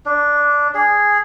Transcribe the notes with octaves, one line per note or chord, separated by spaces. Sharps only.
D4
G#4